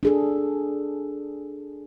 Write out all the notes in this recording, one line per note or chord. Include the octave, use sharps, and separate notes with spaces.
D4 G#4 A4